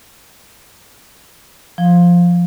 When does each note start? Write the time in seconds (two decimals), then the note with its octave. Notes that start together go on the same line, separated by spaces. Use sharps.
1.78 F3